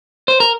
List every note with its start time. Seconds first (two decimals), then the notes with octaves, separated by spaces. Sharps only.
0.28 C5
0.40 A#4